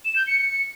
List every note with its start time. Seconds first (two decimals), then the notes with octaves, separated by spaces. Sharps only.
0.05 E7
0.16 G6
0.27 C#7
0.38 C#7